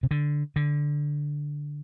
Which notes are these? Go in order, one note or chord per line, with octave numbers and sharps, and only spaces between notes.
C3
D3
D3